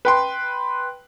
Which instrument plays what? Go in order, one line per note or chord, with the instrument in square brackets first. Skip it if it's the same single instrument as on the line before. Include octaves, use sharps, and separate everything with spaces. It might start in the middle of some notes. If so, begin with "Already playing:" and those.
[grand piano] B4 G5 C6